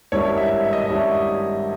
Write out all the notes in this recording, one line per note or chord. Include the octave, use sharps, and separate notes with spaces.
G#1 G2 G3 C#4 E4 C#5
E5
E5
D#5
E5
G#1 G2 G3 C#4 E4